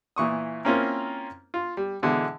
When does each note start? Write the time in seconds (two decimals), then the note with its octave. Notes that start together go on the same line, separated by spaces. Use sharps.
0.16 A#2 E3 C#6 D#6
0.65 A#3 C4 C#4 E4 F4 A#4
1.54 F4
1.77 G3
2.03 B2 D3 E3 G#3